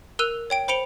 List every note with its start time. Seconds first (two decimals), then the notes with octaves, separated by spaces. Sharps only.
0.19 A#4 E6 F#6 D#7 F7
0.50 C#5 G5 D7
0.68 C5 B5 C#7 D7 F7 G7